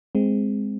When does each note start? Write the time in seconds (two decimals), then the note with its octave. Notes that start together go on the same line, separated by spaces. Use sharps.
0.15 G#3 C4